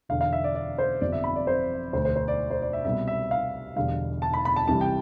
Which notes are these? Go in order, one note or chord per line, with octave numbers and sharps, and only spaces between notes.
E1 E2 D3 F5
F5
E5
D5
D5
C5
G1 F2 C3 F3 D5
E5
B5
D5
C5
E1 D2 D3 A3 C5
C5
C5
D5
C5
D5
E5
C2 B2 G3 B3 E5
E5
F5
E1 E2 D3 G3 F5
A5
B5
B5
A5
C2 C3 E3 G3 A5
G5